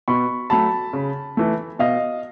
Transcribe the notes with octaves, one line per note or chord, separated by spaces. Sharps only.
B2 B5 C#6
F#3 A3 A5 B5
C#3
E3 A3
B2 D#5 F5